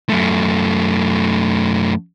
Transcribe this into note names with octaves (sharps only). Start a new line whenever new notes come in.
F#2 A3